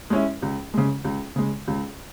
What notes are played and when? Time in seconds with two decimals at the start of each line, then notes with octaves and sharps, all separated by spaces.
0.10 G#3 C#4 E4
0.42 C#2
0.74 C#3 G#3
1.04 C#2
1.36 C#3 G#3
1.68 C#2